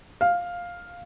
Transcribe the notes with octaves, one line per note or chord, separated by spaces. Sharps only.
F5